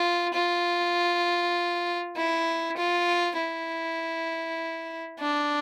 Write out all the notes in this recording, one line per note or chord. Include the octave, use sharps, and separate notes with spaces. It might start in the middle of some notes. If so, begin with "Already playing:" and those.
Already playing: F4
F4
E4
F4
E4
D4